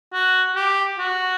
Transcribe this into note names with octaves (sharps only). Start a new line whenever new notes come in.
F#4
G4
F#4